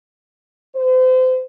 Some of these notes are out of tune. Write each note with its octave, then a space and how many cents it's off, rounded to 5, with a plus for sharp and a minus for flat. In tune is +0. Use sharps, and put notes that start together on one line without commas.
C5 -35